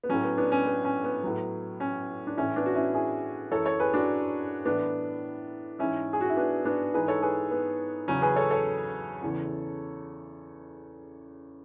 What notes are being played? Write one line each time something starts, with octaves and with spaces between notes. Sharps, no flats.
B3
A2 F#3 C#4
B3
B3 D4
C#4
B3
C#4
B3
A2 F#3
C#4
D4
A2 E3 C#4 E4
B3 D4
F#4
C#4 E4
E4 G#4
F#2 E3 A4 C#5
A4 C#5
G#4 B4
D4 F#4
A2 E3 B3 D4
G#2 E3 C#4 E4
G#4
F#4
E4
B3 D4
B3 D4
G#2 E3 G#4 B4
A4 C#5
G#4 B4
B3
E2 C#3 F#3 C#4
G#4 B4
A4 C#5
A4 C#5
E2 C#3 E3